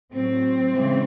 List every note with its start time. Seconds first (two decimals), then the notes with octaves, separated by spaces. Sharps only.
0.12 A2 F#3 C4
0.72 C#3 E3 G#3